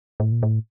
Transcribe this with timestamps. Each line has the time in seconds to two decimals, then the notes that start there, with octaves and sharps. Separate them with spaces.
0.20 A2
0.32 A#2
0.43 A2